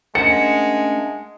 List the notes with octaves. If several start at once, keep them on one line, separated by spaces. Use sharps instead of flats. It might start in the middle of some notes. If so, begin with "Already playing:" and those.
G#3 A3 C#4 D4 A#4 C5 F#5 C#7